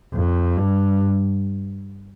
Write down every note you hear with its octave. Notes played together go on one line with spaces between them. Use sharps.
F2
G2